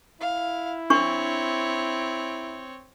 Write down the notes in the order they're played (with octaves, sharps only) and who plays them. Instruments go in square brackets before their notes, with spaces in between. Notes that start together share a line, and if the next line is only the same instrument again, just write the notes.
[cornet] E4 [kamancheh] F5
[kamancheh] C4 C#5 [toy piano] D4 C#6